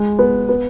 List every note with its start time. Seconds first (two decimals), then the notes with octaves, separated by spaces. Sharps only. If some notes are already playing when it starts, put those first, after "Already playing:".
Already playing: G#3
0.19 B3
0.49 B3